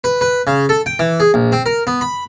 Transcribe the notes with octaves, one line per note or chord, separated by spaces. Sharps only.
B4
B4
C#3
A4
G5
E3
G#4
A#1
C4
A#4
B3
B5